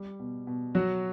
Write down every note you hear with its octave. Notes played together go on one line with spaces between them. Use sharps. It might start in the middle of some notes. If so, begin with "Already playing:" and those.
Already playing: G3
B2
B2
F#3 F#4